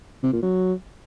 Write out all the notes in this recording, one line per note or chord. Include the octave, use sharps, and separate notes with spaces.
C3
A#2
F#3